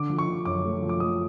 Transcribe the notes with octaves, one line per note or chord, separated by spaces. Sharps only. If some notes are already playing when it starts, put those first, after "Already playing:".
Already playing: D3 D6
F3
C#6
D3
F#2 D6
A3
F3
D6
A3 D#6